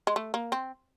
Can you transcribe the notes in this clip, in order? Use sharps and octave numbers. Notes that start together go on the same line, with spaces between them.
G#3
A3
A#3
C4